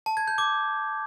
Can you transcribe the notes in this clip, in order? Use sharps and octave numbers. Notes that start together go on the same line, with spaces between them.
A5
G#6
G6
D6